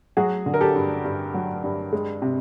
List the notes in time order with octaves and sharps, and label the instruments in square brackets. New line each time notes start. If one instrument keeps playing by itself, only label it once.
[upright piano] F#3 F#4 G#4
D3
A#4
G4 A4
G2
G2
F#3
G2
G#3
C3